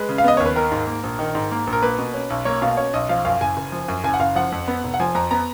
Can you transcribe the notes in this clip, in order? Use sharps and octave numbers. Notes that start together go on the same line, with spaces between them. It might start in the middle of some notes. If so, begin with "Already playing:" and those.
Already playing: G#3 B4
C#3
F5
B3 D#5
D#2 C#5
B4
D#3 A#4
G#2
A#3
A#1
D#3
G#2
A#3
A#1
A#4
A#3 B4
B2
C#4
B1
A#3 C#5
B2 F5
C#4 C#5
B1 D#5
F3 F5
F#2 F5
F#1 G#5
F#1
F3
F#2
F#1 G#5
F#5
F#1 F5
F3 F#5
F2
B3
F1
F#5
F3 G#5
F2 A#5
B3 A#5